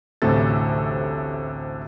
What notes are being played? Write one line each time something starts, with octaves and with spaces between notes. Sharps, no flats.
A1 D2 A2 C3 A4 A6